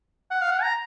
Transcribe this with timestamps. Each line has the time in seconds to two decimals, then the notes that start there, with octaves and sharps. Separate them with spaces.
0.31 F#5
0.42 F5
0.52 F#5
0.63 A#5